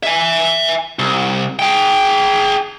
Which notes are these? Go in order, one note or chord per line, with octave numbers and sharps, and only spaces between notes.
E5 G#5
C2
G#4 G5